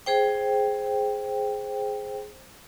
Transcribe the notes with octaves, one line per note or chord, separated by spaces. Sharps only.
G#4 C5 G5